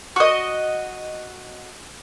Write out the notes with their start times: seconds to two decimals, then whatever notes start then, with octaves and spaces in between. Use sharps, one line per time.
0.16 F#4 D#5